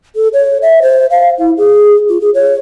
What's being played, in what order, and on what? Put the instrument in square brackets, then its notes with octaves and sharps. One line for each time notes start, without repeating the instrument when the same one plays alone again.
[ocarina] A4
C#5
E5
C5
F5
E4
G#4
F4
G#4
C#5